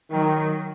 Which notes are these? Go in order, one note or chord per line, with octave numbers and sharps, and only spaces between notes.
D#3 F#3